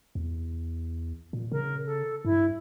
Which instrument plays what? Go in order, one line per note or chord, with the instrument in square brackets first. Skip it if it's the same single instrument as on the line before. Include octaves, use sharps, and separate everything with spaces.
[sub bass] E2
A#2
[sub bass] C#3 [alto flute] A#4
[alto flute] A4
[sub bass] G2 [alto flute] E4